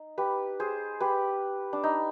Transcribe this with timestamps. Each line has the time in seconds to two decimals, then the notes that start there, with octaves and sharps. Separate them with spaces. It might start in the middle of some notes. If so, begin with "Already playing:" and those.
Already playing: D#4
0.18 G4 B4
0.60 G#4 C5
1.00 G4 B4
1.73 D4
1.83 D#4